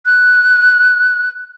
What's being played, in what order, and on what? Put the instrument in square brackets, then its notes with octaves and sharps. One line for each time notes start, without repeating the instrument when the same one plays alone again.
[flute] F#6